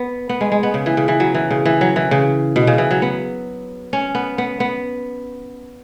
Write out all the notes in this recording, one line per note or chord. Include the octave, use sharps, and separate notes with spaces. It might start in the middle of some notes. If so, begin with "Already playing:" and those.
Already playing: B3
B3
G#3
G#3
B3
C#3
E3
C#3
E3
F#3
E3
C#3
E3
F#3
E3
C#3
B2
C#3
E3
F#3
B3
C#4
B3
B3
B3